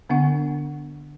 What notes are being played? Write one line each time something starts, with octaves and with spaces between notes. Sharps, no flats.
D3 B3 D4 F#5 C#6